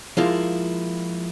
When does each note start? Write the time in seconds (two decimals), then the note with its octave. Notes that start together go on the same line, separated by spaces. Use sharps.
0.17 F3 G#3 A#3 E4 F4